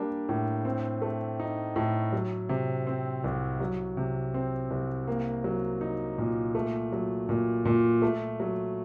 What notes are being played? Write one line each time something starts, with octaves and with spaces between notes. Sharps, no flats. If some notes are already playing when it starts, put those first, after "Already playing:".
Already playing: G3 A#3 D4
A2
C4
A3
D#4
A2
F#3
C3
C4
C2
F#3
C3
C4
C2
A#3
F#3
D#4
A#2
A3
F#3
A#2
A#2
A3
F#3